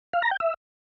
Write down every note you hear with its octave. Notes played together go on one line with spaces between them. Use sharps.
F5
A#5
G5
E5